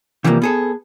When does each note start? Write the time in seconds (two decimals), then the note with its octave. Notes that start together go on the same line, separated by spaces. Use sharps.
0.24 C3 E3 F3 G3 A3 A#3
0.42 B3 G#4 A4